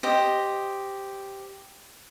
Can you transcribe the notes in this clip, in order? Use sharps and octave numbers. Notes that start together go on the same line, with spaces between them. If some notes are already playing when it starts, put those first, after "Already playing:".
G4 C5 D#5